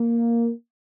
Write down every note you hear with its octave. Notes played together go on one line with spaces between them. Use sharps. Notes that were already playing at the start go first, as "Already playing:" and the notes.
Already playing: A#3